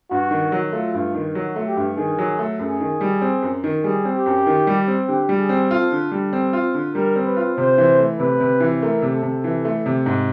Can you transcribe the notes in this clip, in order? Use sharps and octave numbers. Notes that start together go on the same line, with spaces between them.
G2 F#4
D#3
F#3
A3 F4
G2
D#3
F#3 F#4
A3
G4
G2
D#3 G#4
F#3
A3
F#2 G#4
D#3
G3
C4
F#2
D#3
G3 G#4
C4
G4
F#2
D#3
G3
C4
D3 G4
G3
G#4
C4
F4 A4
D3
G3
C4
F4
D3
G3 A#4
C4
B4
F4
C3 C5
E3
A3
C3 B4
C3
E3
A3 A#4
C3
A4
C3
E3
A3
C3
G#2